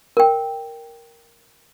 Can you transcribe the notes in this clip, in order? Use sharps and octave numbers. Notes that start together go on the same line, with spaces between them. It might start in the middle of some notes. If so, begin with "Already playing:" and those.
A#4 G5